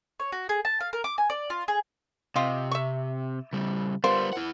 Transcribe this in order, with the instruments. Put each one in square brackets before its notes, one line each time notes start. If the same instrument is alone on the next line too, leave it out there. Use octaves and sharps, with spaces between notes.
[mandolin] C#5
F#4
G#4
A5
F5
A#4
D6
G#5
D5
F4
G#4
[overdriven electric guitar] C3 [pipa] F4 G4 D#5
[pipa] E5 C#6
[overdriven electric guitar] C#3 G3
[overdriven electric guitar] G3 B3 [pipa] F4 A#4 C5
[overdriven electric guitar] E4 F#5